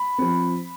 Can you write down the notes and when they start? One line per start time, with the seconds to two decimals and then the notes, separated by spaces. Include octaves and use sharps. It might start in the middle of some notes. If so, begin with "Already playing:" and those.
Already playing: B5
0.18 F3 C4